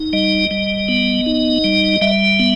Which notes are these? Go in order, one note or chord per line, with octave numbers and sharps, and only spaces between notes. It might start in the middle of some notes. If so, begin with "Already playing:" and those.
Already playing: D#4
G3 D#5
G3
B3
D#4
G3
G3 E5
B3